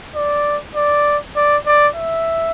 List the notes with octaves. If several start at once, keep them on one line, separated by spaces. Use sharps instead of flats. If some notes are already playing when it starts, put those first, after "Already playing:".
D5
D5
D5
D5
E5